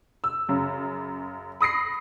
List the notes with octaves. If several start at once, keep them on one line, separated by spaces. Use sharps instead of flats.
E6
F#2 C#3
B5 D#6 A#6 C7